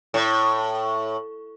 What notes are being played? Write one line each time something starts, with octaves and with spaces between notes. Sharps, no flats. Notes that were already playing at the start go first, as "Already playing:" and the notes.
A2